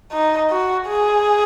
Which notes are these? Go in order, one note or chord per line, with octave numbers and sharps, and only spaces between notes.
D#4
F#4
G#4